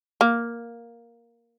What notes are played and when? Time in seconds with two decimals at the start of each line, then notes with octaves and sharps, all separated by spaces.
0.21 A#3